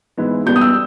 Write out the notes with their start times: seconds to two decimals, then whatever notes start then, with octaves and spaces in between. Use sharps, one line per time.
0.17 G#2 E3 G#3 B3 E4
0.46 B2 G3 B3 G6
0.56 D#6
0.61 E6